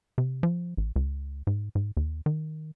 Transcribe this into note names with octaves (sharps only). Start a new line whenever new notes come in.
C3
F3
A1
C#2
G#2
G#2
D#2
D#3